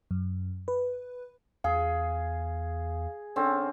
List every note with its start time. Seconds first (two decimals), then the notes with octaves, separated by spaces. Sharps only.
0.11 F#2
0.68 B4
1.64 E2 G#4 F5
3.36 D3 C4 C#4